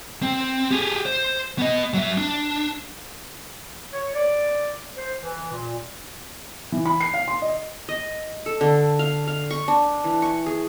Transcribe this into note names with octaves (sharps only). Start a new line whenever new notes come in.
C4
G4 G#4
C5
B3 D#5
F#3 E5
D4
C#5
D5
C5
E3
A#2
E3
B5
C7
F5
C6
D#5
D#5
A4
D3
F5
F5
C#6
D4
E3
C#6
G#4